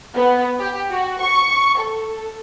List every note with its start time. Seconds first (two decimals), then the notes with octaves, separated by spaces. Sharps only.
0.14 B3
0.59 G4
0.90 F#4
1.20 C#6
1.79 A4